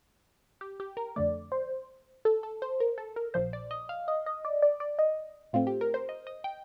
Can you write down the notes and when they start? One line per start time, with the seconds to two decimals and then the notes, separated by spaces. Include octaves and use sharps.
0.61 G4
0.80 G4
0.97 A#4
1.16 F2 D3 A3 D5
1.52 C5
2.25 A4
2.43 A4
2.62 C5
2.80 A#4
2.98 A4
3.16 A#4
3.34 A#1 A#2 F3 C5
3.53 D5
3.71 D#5
3.89 F5
4.08 D#5
4.26 D#5
4.45 D5
4.62 D5
4.80 D5
4.99 D#5
5.53 A2 A3 C4 F4
5.67 G4
5.81 A#4
5.94 C5
6.09 D#5
6.27 D#5
6.44 G5